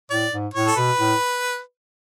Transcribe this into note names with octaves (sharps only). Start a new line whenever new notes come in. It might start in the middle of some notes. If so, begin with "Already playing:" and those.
A2 D5
G#2
A2 C#5
A4
B2 B4
A2